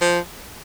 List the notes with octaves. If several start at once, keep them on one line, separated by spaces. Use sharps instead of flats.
F3